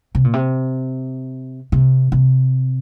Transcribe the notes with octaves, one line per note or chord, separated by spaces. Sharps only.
C3
A#2
C3
C3
C3